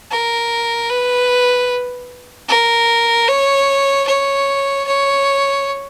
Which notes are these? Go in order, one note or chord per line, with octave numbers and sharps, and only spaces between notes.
A#4
B4
A#4
C#5
C#5
C#5